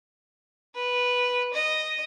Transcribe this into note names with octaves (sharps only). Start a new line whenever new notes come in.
B4
D#5